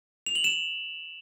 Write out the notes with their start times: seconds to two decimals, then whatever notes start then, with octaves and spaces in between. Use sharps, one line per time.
0.26 F7
0.35 F#7
0.44 E7